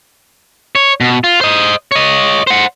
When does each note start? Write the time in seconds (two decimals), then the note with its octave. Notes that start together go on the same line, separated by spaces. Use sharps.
0.75 C#5
1.01 B2
1.24 F4
1.41 C5 D#5
1.92 C#5 D#5
2.47 C5 F#5